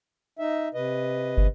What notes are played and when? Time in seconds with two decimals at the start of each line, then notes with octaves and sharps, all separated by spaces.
0.39 D#4 E5
0.74 C3 B4 D#5
1.37 G1